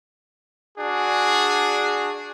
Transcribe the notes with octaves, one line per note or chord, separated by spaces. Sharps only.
D4 F#4 G#4